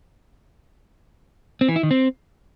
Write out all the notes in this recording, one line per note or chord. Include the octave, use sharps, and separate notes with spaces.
C4
E3
E4
D#3
C4